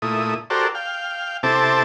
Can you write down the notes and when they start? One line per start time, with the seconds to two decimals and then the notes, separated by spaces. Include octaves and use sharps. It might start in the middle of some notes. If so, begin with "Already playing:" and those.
0.02 A#2 A3 E4 D#6
0.50 F#4 G4 A4 A#4 C5 D5
0.75 F5 G5
1.43 C3 C4 E4 A4 A5 D6